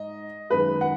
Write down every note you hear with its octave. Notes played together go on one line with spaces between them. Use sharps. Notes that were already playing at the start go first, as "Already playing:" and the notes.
Already playing: G#2 D#4 D#5
F#2 D#3 G#3 B4
F#5